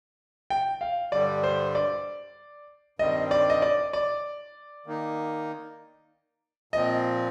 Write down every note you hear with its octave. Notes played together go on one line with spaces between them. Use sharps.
G5
F5
G2 D3 G3 D5
C5
D5
G2 D#3 G3 C4 D#5
D5
D#5
D5
D5
D#3 A#3 D#4
A#2 F3 C4 D#5